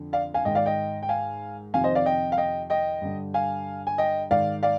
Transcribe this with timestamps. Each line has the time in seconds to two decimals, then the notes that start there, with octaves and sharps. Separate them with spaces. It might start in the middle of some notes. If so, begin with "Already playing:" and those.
Already playing: F2 D3
0.13 D5 F5
0.34 F5 G#5
0.45 G#2 D#3 D#5 G5
0.55 D5 F5
0.66 D#5 G5
1.03 G5
1.09 F5 G#5
1.74 F2 C3 D#3 F5 G#5
1.84 C5 D#5
1.95 D5 F5
2.06 D#5 G5
2.32 F5
2.37 D#5 G5
2.70 D#5 G5
3.02 G2 D3
3.34 F5 G#5
3.87 G#5
3.98 D#5 G5
4.31 G#2 D#3 D5 F5
4.63 D5 F5